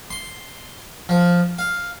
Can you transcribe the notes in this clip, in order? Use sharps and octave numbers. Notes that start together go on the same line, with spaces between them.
C6
F3
F5